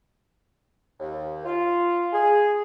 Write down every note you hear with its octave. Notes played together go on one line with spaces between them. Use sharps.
D#2
F4
G#4